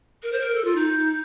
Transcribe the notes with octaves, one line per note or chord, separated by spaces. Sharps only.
A#4
C5
A#4
A4
F4
D#4